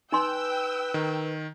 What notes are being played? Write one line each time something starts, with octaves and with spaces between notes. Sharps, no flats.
D#4 B4 G5 G#5 C6 E6
D#3